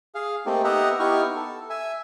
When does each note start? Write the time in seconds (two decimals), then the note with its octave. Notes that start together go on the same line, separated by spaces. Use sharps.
0.15 G#4 F5
0.46 A3 A#3 C4 D#4 G4 A4
0.64 B3 G4 D#5 E5 F#5 A#5
1.00 B3 D#4 E4 G4 C#6 F6
1.36 A4
1.70 E5 G#5